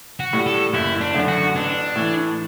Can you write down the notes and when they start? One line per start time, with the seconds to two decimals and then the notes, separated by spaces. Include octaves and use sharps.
0.20 F#4
0.33 A2 G3
0.46 A4
0.74 F#1 E4
1.00 D4
1.14 F#2 D3 A3
1.28 F#4
1.55 A1 D4
1.96 A2 E3